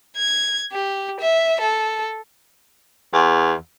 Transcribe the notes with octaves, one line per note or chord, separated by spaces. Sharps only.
G#6
G4
E5
A4
E2